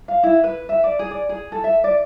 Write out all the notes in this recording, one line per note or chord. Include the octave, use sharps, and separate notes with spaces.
F5
E4
B4
E5
D5
G#4
D5
G#4
A4
E5
D5